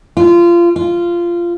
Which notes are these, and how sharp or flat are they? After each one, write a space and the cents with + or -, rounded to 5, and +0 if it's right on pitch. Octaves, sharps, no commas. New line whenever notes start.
F4 -25
F4 -15